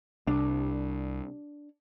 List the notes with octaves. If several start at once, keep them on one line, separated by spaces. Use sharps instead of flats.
C2 D4